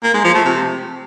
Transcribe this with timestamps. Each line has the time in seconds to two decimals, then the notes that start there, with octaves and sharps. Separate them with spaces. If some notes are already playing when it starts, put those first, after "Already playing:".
0.04 A#3
0.14 G#3
0.24 F3
0.35 A3
0.45 C3